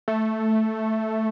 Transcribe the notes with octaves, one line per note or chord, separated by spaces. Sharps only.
A3